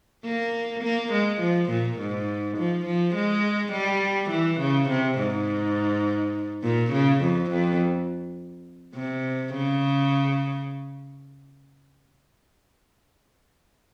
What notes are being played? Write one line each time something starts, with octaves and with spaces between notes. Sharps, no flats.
A#3
A#3
G#3
F3
A#2
G#2
F3
F3
G#3
G3
E3
C#3
C3
G#2
A#2
C#3
F2
F2
C3
C#3